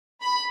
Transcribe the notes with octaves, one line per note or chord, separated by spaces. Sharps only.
B5